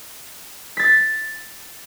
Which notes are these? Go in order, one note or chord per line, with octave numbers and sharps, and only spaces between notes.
A6 B6